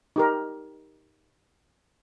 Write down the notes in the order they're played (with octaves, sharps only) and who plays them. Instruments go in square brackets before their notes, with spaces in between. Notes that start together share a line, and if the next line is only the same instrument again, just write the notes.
[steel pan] D#4 G4 A#4